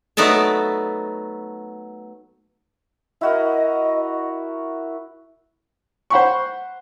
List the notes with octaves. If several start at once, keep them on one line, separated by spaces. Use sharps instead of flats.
F#3 A3 B3 D#4 D5 A5
E4 F#4 A#4 D#5
C5 F#5 B5 C#6